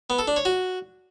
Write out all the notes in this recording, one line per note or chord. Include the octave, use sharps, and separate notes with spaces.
B3
A4
D4
C#5
F#4